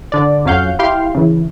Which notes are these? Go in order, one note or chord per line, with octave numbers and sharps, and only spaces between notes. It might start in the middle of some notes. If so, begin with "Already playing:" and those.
D3 D5
F2 F#3 C#4 F5 F#5 G6
E4 G4 F5 G5 C6
C#3 E3